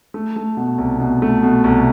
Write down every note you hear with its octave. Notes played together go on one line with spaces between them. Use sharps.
A3
A3
B2
C2
B2
A3
B2
C2